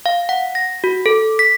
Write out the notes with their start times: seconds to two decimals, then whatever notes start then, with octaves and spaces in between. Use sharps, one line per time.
0.06 F5
0.29 F#5
0.55 A#6
0.84 F#4
1.06 A4
1.39 B6